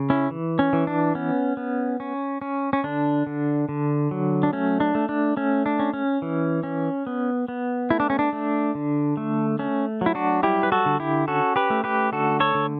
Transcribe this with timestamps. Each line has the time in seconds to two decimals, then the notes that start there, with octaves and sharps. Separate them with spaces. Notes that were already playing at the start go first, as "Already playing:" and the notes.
Already playing: C#3
0.10 C#4 E4
0.31 E3
0.59 C#4
0.73 E3
0.87 D4
1.15 B3 C#4
1.57 B3
2.00 C#4
2.42 C#4
2.73 C#4
2.84 D3 D4
3.27 D3
3.69 D3
4.11 F#3
4.43 D4
4.53 A3 C#4
4.80 D4
4.95 A3
5.09 D4
5.37 A3 C#4
5.66 D4
5.79 C#4
5.94 C#4
6.22 E3
6.63 C#4
7.07 B3
7.48 B3
7.90 A3 E4
8.00 D4
8.10 C#4
8.19 D4
8.33 A3
8.75 D3
9.17 A3
9.59 A3 C#4
10.01 F#3 E4
10.15 D4 F#4
10.43 G3 E4 G4
10.63 B4
10.72 F#4 A4
10.86 D3
11.00 E4 G4
11.28 C#4 F#4 A4
11.56 G4 B4
11.70 A3
11.84 G4 B4
12.12 D3 F#4 A4
12.40 A4 C#5
12.55 D3